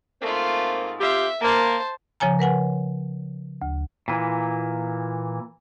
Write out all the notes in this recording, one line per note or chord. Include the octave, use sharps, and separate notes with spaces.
G#2 A3 A#3 C4 F4
C4 F4 G4 E5
A#3 C5 A5
C#3 F3 C#5 G#5 A#5
A#4 B4 F#5 G#5
D2
A#2 E3